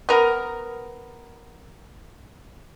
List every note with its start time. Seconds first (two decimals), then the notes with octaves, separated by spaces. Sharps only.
0.09 B3 A#4